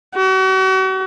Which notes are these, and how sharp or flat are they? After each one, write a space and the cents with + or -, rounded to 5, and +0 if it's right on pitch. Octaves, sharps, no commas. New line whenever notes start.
F#4 +40